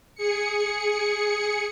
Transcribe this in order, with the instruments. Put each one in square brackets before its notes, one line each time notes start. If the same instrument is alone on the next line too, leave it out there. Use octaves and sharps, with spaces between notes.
[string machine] G#4 C#7